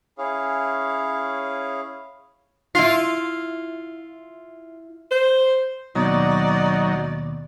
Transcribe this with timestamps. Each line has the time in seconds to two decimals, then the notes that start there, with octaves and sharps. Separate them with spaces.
0.18 C#4 E4 G#4 C#5 F5
2.75 E4 F4 C7
5.12 C5
5.95 D#2 B2 F#3 D#4 D5